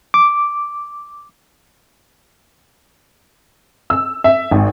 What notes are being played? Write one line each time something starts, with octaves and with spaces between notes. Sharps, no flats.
D6
E6
E5
G#1